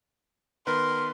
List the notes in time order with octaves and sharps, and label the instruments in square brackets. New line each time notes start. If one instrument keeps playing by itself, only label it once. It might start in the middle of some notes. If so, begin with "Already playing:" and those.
[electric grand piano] D#3 B3 B4 [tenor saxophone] A#4 [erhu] C6